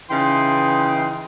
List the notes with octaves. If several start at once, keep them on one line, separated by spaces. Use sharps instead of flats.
C#3 E3 D#4 G5 C6